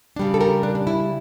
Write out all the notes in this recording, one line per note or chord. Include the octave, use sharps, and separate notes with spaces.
C#3 G3 D4
A4
G4 A#4
D4
D4
E4